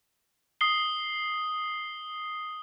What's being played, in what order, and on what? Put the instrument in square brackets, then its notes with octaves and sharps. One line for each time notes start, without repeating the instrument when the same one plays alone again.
[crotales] D#6 C7 G7